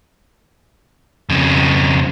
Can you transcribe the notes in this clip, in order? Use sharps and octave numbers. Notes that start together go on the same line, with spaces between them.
F2 C#3